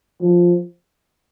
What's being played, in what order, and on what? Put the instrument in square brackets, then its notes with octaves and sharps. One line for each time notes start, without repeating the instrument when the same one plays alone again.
[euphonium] F3